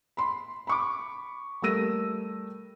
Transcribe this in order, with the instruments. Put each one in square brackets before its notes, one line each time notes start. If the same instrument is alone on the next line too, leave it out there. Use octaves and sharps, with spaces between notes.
[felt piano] B5 C6
B5 C#6 D6
G3 A3 A#4 E6 A#6 D#7